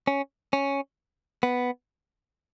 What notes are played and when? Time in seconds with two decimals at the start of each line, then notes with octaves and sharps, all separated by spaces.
0.07 C#4
0.53 C#4
1.43 B3